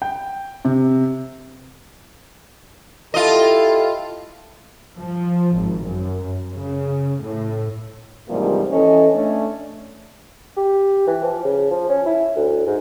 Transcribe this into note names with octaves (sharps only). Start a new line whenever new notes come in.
G5
C3
E4 F4 G4 A4 D#5
F3
G#1
F#2
C#3
A2
G#2 C3 E3 F3 G3 A#3
E3 C#4 A4 D#5
A3 C#4 D4
G4
E3
F3
C#3
F3
C#4
E4
D2
G#2